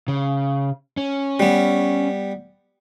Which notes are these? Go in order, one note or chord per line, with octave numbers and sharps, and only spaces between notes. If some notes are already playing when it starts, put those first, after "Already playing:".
C#3
C#4
G3 B3